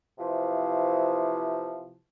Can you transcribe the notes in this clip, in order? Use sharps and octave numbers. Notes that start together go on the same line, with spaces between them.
C3 E3 F3